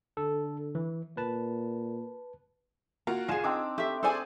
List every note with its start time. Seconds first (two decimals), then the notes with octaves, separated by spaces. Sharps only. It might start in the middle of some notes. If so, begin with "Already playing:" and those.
0.17 D3 A4
0.75 E3
1.17 A#2 B4 A5
3.07 A#3 F4 F#4 A#5
3.28 C2 F4 G#4 G#5 E7
3.44 C4 D4 D#4 D6 E6
3.78 A3 G4 E5
4.03 G#4 A4 C5 D5 G#5 C6